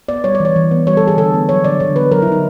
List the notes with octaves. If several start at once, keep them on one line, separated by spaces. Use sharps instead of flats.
B3 D5
G3 C#5
D5
E3 C#5
E3
B3
G3 C#5
A4
E3
G#4
D3 A4
B3
F#3 C#5
D3 D5
D3 C#5
B3 B4
F#3 A#4
E4
D3 D#4